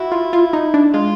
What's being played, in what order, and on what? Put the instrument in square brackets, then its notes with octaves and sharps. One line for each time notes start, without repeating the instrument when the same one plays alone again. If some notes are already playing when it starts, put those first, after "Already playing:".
Already playing: [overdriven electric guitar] E4 [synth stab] F#4
[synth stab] F4
F4
D#4
D4
[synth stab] G#3 [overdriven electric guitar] F4